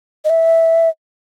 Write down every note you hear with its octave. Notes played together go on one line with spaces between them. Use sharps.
D#5
E5